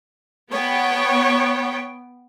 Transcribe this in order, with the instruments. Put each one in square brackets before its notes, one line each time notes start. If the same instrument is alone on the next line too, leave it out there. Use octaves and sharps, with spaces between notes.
[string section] B3 G5 [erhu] C#5